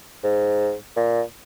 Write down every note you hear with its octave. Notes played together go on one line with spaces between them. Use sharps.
G#2
A#2